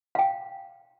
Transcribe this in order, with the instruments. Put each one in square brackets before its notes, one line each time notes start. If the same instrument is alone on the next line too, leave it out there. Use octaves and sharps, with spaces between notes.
[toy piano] F5 G5